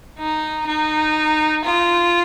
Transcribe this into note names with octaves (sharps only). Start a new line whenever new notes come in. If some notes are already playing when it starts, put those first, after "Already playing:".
D#4
D#4
F4